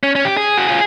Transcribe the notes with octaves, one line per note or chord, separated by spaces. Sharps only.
C#4
C#4
G4
G#4
F#4
F4